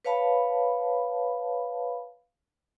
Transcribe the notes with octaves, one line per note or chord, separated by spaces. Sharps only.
B4 C#5 F5 A5 B5